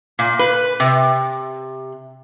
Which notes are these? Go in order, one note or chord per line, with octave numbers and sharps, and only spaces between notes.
A#2
B4
C3